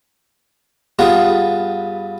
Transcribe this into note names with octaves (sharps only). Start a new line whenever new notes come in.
G2 B3 F4 G#4